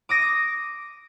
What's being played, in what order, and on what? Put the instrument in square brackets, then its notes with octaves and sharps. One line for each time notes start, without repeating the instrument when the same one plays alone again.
[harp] D6 D#6 A#6 D7